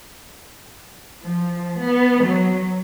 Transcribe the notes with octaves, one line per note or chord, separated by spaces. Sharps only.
F3
B3
F#3